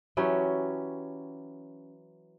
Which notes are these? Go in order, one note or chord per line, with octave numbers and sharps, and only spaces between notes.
E3 F#3 C#4 G4